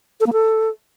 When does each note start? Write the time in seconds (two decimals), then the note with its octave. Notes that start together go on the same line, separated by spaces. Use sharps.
0.20 A4
0.27 A#3
0.33 A4